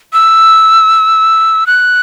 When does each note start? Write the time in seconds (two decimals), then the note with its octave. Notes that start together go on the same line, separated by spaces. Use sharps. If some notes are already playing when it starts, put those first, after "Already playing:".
0.13 E6
1.67 F#6